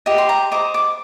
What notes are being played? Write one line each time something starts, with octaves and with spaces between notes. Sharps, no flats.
G4 D#5
C6
A#5
C5 D#5 D6
D6